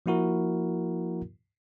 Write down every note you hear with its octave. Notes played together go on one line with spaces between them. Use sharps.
F3 A#3 E4 F#4 A#4